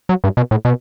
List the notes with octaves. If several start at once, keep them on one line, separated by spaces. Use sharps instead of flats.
F#3
G2
B2
A2
B2